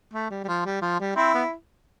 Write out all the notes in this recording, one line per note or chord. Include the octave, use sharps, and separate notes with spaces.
A3
G3
G3
F3
G3
F3
G3
C4 E4
B3